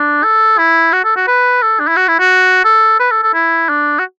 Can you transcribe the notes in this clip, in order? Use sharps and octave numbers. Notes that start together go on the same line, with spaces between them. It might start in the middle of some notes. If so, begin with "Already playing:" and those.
Already playing: D4
A4
E4
F#4
A4
F#4
B4
A4
D4
E4
F#4
E4
F#4
A4
B4
A4
A4
E4
D4
F#4